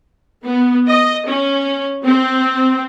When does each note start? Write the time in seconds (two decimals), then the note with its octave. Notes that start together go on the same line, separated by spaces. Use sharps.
0.44 B3
0.88 D#5
1.27 C#4
2.03 C4